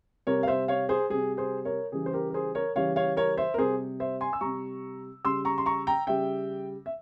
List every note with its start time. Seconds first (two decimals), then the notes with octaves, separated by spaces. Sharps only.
0.27 C3 G3 A#4 C#5
0.43 F5
0.48 C5 E5
0.68 C#5 F5
0.89 G#4 C5
1.10 C3 G3 G#4
1.37 G#4 C5
1.65 A#4 C#5
1.92 C#3 E3 G3 G#4
2.06 C5
2.13 G4 A#4
2.30 A#4
2.34 G#4 C5
2.55 A#4 C#5
2.75 C#3 E3 G3 C#5 F5
2.96 C#5 F5
3.17 A#4 C#5
3.37 C5 E5
3.54 A#4
3.58 C3 G3 G#4 C5
4.00 C5 E5
4.21 G#5 C6
4.33 E6
4.41 C3 G3 A#5 C#6
5.24 C#3 G3 C6 E6
5.45 A#5 C#6
5.58 C6
5.66 A#5 C#6
5.87 G5 A#5
6.07 C#3 G3 E5 G5
6.86 E5